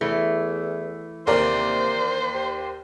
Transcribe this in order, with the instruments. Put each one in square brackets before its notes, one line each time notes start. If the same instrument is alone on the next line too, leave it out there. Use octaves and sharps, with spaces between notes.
[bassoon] E2 [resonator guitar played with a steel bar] E3 A3
[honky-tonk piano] D#2 A#4 D5 [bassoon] C3 [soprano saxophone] C5
[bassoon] G4